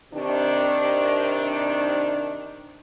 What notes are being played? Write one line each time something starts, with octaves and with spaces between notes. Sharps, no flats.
C3 D#3 D4